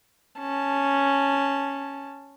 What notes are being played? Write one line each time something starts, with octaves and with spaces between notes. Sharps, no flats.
C#4 A5